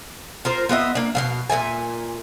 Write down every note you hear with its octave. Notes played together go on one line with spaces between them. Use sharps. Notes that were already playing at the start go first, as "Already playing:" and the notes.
F4 A#4 C5
B3 F4 D#5 E5
A#3 D4
B2 G#3 F5
A#2 A3 E5 G#5